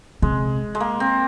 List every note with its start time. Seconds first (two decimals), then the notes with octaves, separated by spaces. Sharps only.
0.22 C3 G#3
0.75 G#3
0.80 A#3
1.00 C4